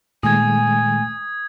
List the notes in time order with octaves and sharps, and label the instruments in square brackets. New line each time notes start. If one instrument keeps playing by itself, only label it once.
[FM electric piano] A#2 [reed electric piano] D#3 G#3 A3 [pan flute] G#5 [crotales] D#6 G#6